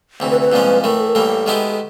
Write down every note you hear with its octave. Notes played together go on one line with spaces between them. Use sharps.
D2 C3 E3
B4
B4
C2 A#2 F3 G#3 C#4
A2 E3 A3 A#4
A4
A#4
A2 E3 G3 A#3 A4
D#3 G#3 B3 E4 G4